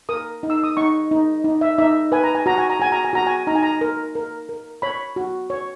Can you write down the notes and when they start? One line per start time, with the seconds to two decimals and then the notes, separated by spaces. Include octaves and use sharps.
0.09 A#4 D#6
0.43 D#4
0.50 E6
0.64 D#6
0.77 D#4 C#6
1.11 D#4
1.44 D#4
1.61 E5
1.78 D#4 E5
2.12 B4 G#5
2.24 A#5
2.35 G#5
2.46 F#4 A#5
2.58 G#5
2.70 A#5
2.80 F#4 G#5
2.92 A#5
3.05 G#5
3.13 F#4 A#5
3.27 G#5
3.47 D#4 A#5
3.55 G#5
3.63 A#5
3.81 A#4
4.15 A#4
4.49 A#4
4.82 C#5 B5
5.16 F#4
5.50 C#5